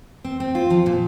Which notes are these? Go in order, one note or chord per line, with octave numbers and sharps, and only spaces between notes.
C4
C4
F4
F3
A#2